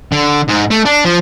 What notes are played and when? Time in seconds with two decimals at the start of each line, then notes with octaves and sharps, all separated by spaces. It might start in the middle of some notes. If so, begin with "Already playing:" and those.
0.12 D3
0.48 G#2
0.71 A3
0.85 D4
1.05 F3